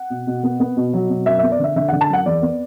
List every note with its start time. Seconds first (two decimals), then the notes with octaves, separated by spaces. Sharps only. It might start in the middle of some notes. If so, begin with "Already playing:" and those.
Already playing: F#5
0.10 B2
0.27 B2
0.43 B3
0.60 B3
0.77 B2
0.93 F#3
1.10 B2
1.26 F#2 E5
1.39 E5
1.43 B3
1.52 D5
1.59 D3 E5
1.76 D3 E5
1.88 F#5
1.93 D3
2.01 A5
2.10 F#2 F#5
2.26 E2 D5
2.42 B3